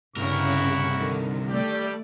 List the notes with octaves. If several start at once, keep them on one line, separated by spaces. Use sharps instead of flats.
C2 G2 C#3 E4 A#4 F#5 C#6
D3 D#3
G3 A3 G4 D5